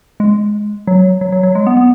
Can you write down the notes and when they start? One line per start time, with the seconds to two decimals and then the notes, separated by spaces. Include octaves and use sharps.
0.20 G#3
0.87 F#3
1.21 F#3
1.32 F#3
1.43 F#3
1.55 G#3
1.67 B3
1.77 B3